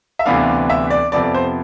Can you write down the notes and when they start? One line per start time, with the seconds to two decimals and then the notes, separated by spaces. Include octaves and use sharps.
0.19 E5
0.26 D2 C3 E3 B3 D4 F5
0.70 E5
0.90 D5
1.12 F2 C3 F3 B3 D5
1.23 D5
1.34 C5